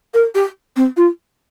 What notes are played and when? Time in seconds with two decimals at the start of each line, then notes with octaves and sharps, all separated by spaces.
0.14 A#4
0.35 G4
0.76 C4
0.97 F4